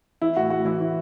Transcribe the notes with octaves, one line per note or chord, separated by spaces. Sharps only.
E3 E4
A2 F#4
A2 F#4
E3 E4
E3